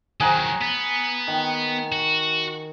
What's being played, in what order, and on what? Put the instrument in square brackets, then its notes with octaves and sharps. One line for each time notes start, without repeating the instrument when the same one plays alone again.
[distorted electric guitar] D#3 F#3 [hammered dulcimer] G#4 F#5 A#5
[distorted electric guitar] B3
[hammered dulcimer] D#3
[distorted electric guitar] F#4